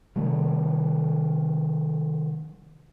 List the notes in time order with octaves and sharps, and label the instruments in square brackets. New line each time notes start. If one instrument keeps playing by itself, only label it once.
[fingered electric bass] C3 D#3 G3 A3